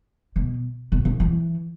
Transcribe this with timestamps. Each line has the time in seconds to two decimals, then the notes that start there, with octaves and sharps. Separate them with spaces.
0.36 B2
0.92 B2
1.05 C#3
1.20 E3